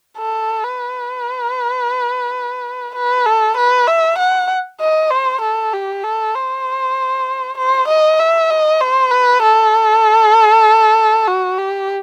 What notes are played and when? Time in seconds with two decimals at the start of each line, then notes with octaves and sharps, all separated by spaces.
0.18 A4
0.64 B4
2.95 B4
3.26 A4
3.57 B4
3.88 E5
4.18 F#5
4.80 D#5
5.11 C5
5.41 A4
5.73 G4
6.03 A4
6.35 C5
7.58 C5
7.88 D#5
8.19 E5
8.50 D#5
8.81 C5
9.11 B4
9.42 A4
11.27 F#4
11.58 G4